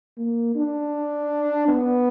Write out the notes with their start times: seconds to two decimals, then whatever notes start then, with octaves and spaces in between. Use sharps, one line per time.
0.18 A#3
0.55 D4
1.68 B3